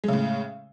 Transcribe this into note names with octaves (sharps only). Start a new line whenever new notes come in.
A2 C#3 G#3